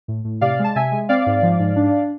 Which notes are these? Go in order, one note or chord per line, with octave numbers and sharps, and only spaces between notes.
A2
A2
C3 D5 F5
G#3
A5
C3 E5 G#5
G#3
C4 D5 F5
G#2
F3
G#2
D4